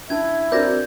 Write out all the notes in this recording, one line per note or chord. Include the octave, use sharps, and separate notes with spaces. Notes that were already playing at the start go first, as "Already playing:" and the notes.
C#4 D4 E4 A5 G#6
C4 D4 F#4 A#4 B4 D5 G6 A#6